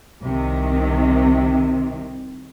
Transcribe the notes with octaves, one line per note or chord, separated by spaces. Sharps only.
C2 C3 D#3